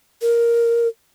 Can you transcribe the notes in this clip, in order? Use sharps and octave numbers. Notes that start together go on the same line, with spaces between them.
A#4